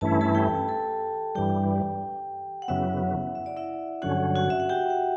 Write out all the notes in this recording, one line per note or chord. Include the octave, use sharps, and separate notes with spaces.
G2 E3 A3 C#4 E4 A5
A4 A5
G4 G5
A4 A5
G2 E3 G3 G4 G5
F#5
F#2 C#3 F#3 B3 E4 E5
E5
D5
E4 E5
G2 D3 F#3 C#4 F#4 F#5
F#4 F#5
E5
F#5
G4 G5
F#5